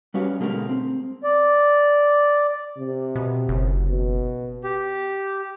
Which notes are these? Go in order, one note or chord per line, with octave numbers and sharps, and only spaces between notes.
G3 C#4 F#4 B4 C#5 F5
B2 D3 G#3 A3 G4 A#4
C4
D5
C3
B2
F#1
B2
G4